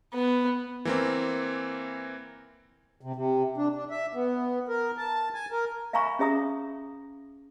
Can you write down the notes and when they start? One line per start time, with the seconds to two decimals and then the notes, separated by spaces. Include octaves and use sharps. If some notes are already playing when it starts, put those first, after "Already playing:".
0.14 B3
0.85 E3 A#3 C4
3.01 C3
3.16 C3
3.57 D4
3.75 D4
3.91 E5
4.15 B3
4.68 A#4
4.98 A5
5.35 G#5
5.52 A#4
5.93 E5 F5 G#5 A#5 B5 C#6
6.19 C#4 G#4 E5 A#5 D#6